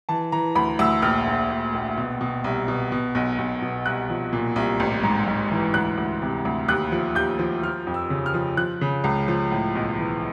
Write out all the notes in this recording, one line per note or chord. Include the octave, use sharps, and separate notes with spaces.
E3 A5
E3 A#5
D2 B5
D2 E6
A#1 F6
A#1
A#1
A#1
B2
B2
C2
B2
B2
B1
B1
B2
C2 F#6
F3
A#2
C2
A1
G#2
G#2
E3
D2 F#6
D2
C3
D2
D#2 F#6
F3
D#2 G6
F3
F3 F6
F2
E6
C#3
F6
F3
F3 F#6
C#3
C#2
F3
A2
B1
E3